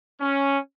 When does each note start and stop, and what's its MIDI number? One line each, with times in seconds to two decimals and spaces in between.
0.20 0.57 61